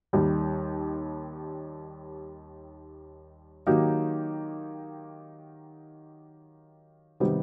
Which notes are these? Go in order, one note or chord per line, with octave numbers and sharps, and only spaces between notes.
D#2 D#3 G3
D#3 F#3 A#3 D#4 G4
C3 D#3 G3 B3